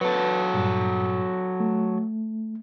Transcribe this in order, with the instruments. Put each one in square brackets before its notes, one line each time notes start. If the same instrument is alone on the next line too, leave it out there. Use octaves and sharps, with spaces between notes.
[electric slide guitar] F#3 A4 [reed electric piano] B4
[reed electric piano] G2 A#2
A3